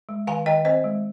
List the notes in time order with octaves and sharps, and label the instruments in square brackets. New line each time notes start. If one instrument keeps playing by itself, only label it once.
[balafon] G#3
D#3 F5 G#5
D#3 D#5 G5
C4 C5 D#5
G#3